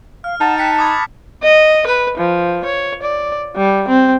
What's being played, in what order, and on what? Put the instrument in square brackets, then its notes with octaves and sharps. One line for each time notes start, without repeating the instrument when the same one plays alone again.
[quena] F5 [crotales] F6
[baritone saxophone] D#4 [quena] F#5 [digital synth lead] A5
[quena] G5 [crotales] F#6 B6 C#7
[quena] B5 [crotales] D6 D#6 G#6
[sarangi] D#5
B4
F3
C#5
D5
G3
C4